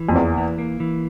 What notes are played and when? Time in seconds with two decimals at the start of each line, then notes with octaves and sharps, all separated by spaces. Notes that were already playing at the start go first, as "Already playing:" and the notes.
Already playing: E3
0.09 F2
0.16 E2 A#3
0.37 E3
0.58 A#3
0.80 E3